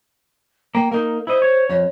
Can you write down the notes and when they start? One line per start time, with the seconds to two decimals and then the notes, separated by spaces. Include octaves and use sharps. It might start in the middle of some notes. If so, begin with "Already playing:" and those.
0.75 A#3 G5
0.92 A#3 D#4 A#4
1.27 E4 C5 D#5
1.42 C#5
1.69 F2 C#5